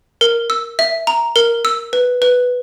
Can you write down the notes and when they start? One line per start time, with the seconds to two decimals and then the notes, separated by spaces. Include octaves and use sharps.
0.21 A#4
0.50 E6
0.79 E5
1.07 A#5
1.36 A#4
1.65 E6
1.93 B4
2.22 B4